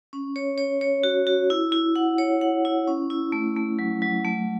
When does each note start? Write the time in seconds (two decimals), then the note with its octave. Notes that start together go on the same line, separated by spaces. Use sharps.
0.13 C#4
0.36 C#5
0.58 C#5
0.81 C#5
1.03 F#4
1.27 F#4
1.50 E4
1.72 E4
1.96 F#5
2.18 C#5
2.41 F#5
2.65 E4
2.87 C#4
3.10 E4
3.32 A3
3.56 A3
3.79 F#3
4.02 F#3
4.25 A3